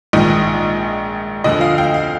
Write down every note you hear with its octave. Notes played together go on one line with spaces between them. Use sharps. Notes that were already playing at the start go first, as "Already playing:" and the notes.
A#1 G#2 D#3 D#5
D2 D3 F3 D#5
F5
G5
F5